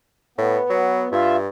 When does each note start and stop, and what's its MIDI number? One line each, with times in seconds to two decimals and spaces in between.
0.38 0.59 45
0.38 1.09 59
0.70 1.06 54
1.12 1.48 43
1.12 1.36 65
1.12 1.36 76